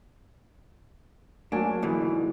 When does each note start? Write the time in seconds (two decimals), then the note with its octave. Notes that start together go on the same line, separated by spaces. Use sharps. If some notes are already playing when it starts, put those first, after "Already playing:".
1.52 F#3 A#3 D4 G#5
1.82 G#2 D3 E3